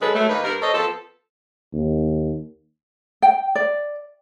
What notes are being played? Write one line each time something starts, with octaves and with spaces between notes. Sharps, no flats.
D3 F#3 G#3 A4 B4
F#3 A3
D#3 A#3 D#4 B4
G2 B3 A#4
A4 C5 C#5 D#5
F3 B3 C4 A4
D#2
G5
D5